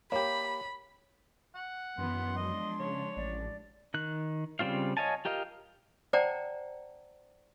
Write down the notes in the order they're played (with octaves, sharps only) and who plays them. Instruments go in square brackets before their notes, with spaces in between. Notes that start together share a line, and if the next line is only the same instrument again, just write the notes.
[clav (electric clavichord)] A#3 G4 [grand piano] C#5 [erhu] B5
[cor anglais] F#5
[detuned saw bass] F#2 [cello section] D#3 E3 B3 [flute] C6
[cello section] F3 G#3 D4 [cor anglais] D#5
[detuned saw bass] C#3 [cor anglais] C#5
[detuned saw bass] A1 [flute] D5
[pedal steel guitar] D#3 F#6
C#3 G3 C4 F4 F5
C#5 D#5 F5 G#5 A5
F4 G4 A#4 D#5 F5
[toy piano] C5 D5 F#5 G5 A5 A#5